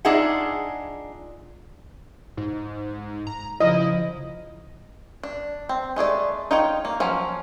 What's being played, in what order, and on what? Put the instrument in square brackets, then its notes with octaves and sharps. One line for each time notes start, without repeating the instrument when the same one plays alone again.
[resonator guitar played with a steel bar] D4 D#4 F4 G#4 E5 F#5
[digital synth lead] G#2
A#5
[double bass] C#3 F3 [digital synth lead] E4 [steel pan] D#5
[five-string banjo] D4
C4
G#3 A3 G#4 D5
D#4 F4 C#5 G5
A#3
F3 F#3 C#4